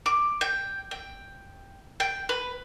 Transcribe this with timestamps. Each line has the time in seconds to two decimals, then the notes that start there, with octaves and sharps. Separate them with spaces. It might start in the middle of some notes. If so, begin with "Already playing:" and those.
0.06 D6
0.41 G5
0.91 G5
2.00 G5
2.29 B4